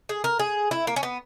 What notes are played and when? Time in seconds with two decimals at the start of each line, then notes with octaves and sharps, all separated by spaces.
0.09 G#4
0.24 A#4
0.39 G#4
0.71 E4
0.87 A#3
0.96 C#4
1.03 B3